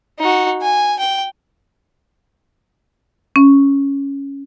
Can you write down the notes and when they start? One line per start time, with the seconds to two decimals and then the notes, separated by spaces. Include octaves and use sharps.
0.19 D#4 F#4
0.62 G#5
0.99 G5
3.36 C#4